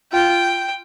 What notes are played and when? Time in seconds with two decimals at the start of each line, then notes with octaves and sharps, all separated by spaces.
0.12 F4 G5